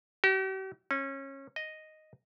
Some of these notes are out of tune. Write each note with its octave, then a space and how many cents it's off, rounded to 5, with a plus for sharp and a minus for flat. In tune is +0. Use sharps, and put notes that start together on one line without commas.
G4 -45
C#4 -25
D#5 +0